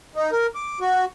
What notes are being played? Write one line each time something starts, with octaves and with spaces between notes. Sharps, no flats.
D#4
A#4
D6
F#4